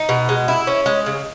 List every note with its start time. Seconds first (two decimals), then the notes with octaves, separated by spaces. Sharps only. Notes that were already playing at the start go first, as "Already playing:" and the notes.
Already playing: D#4
0.09 B2
0.29 G#3
0.48 E4
0.67 C#4
0.86 G#3
1.06 C#3